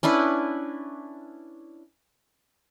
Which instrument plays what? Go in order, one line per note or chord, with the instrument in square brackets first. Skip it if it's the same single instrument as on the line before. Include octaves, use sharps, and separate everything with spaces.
[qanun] C#4 D4 E4 B4